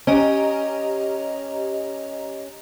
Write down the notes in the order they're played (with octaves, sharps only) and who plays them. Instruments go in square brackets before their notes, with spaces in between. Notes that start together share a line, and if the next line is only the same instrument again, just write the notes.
[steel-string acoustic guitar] C#4 [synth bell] G4 D#5 A#5